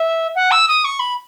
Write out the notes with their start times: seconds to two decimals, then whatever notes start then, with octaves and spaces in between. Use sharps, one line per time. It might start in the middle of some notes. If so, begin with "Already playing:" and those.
Already playing: E5
0.35 F#5
0.51 E6
0.68 D#6
0.84 C#6
0.99 B5